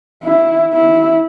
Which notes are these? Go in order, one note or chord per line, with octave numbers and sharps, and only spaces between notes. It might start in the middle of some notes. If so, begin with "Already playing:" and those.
E4
E4